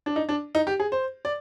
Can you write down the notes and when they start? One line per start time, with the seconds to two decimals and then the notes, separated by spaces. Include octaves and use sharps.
0.06 D4
0.16 D#4
0.29 D4
0.55 D#4
0.67 G4
0.80 G#4
0.92 C5
1.25 D5